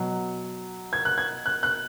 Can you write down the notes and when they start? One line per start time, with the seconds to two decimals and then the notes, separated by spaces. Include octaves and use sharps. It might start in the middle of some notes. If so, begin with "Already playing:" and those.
Already playing: B2 F#3
0.93 G#6
1.05 F#6
1.18 G#6
1.46 F#6
1.63 F#6